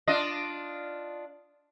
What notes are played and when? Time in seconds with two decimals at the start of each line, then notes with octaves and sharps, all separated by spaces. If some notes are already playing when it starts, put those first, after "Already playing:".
0.07 D4 F4 D#5